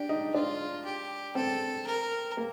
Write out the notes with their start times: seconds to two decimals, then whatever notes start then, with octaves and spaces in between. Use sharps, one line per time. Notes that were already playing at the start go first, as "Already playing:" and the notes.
Already playing: D4 G4
0.09 D#4
0.34 D4 F4
0.85 G4
1.35 C4 A4
1.87 A#4
2.37 A#3